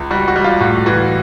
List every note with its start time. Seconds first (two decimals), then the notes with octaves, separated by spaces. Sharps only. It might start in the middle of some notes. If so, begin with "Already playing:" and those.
Already playing: C#2
0.11 G3 F#4
0.28 F#4
0.36 G3
0.44 F4
0.61 A2 F#4
0.86 E3 F#4